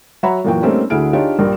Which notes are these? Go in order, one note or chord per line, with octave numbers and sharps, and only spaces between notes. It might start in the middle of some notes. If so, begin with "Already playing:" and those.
F#3 C#5 E5 F#5 A#5 B5
F#2 A#2 E3 A#3 F#4 G5
G3 A3 A#3 C4 C#4 D#4
D2 D3 E4 G#4 F6 D7
D4 D#4 F4 G4 G#4 C#5
A#1 G2 G4 A#4